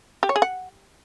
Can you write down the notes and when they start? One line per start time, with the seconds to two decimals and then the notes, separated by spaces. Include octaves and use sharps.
0.23 G4
0.29 C#5
0.36 G#4
0.42 F#5